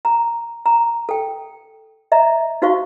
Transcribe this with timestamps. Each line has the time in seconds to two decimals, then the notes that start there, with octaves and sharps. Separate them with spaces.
0.05 A#5
0.66 A#5
1.09 A4 G5
2.12 D#5 E5 A#5
2.62 D#4 F#4 C5 F5 C#6